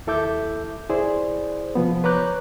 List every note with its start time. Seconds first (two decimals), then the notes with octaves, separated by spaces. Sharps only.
0.07 D#2 E4 A4 E5 D6 G6
0.89 E4 G#4 C5 D5
1.75 C3 F3 B3
2.04 B4 C#5 A#5 D6 F#6 G6